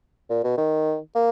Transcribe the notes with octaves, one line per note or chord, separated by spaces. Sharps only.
A#2
B2
D#3
A#3